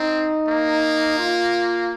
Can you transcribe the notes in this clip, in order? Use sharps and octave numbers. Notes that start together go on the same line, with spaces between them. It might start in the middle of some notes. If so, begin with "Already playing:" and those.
Already playing: C4 D#4
A#3
F4